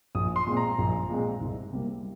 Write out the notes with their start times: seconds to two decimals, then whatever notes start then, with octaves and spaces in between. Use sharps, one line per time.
0.15 A#1 D#6
0.36 C6
0.46 A#2 G#3 C4
0.57 A#5
0.78 A#1
1.09 A#2 G#3 C4
1.41 C2
1.73 C3 G3 A#3